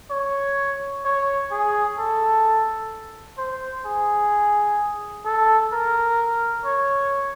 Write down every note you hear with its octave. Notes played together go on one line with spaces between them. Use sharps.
C#5
C#5
G#4
A4
C5
G#4
A4
A#4
C#5